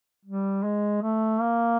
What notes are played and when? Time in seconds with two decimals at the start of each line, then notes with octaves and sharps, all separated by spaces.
0.25 G3
0.63 G#3
1.02 A3
1.40 A#3